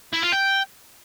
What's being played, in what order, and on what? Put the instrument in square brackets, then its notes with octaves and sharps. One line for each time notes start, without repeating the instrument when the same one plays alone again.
[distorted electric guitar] E4
F4
G5